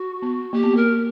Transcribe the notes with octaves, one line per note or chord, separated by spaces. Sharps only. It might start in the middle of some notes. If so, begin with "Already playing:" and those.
Already playing: F#4
B3
A#3 G4
B3
A#3 A#4